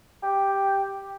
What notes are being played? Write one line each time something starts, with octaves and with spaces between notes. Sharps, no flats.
G4